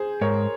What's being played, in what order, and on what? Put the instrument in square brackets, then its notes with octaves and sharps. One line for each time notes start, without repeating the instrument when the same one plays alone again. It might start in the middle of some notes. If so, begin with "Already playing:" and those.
Already playing: [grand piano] G#4 C5
[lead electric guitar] G#2 [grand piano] A#4 C#5